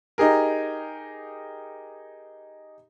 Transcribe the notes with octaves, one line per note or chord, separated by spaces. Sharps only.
D#4 G4 G#4 A#4